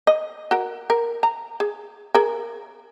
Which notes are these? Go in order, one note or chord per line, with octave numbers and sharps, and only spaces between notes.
D#5
F#4 A#4
A#4
A#5
G#4
G#4 A#4